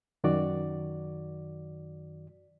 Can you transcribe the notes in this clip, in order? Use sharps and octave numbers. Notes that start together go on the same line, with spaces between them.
F#2 D#3 F#4 D5